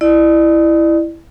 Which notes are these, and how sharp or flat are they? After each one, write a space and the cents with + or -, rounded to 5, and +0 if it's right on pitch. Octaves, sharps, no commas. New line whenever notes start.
E4 +0 D5 +35